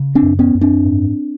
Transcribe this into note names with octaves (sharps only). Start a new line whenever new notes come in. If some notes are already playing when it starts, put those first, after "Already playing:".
Already playing: C#3
C4 D4
F#2
B3 C#4
F#2
C4 D4
G#2